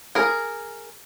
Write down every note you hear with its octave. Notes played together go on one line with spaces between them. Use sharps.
G#4 A#4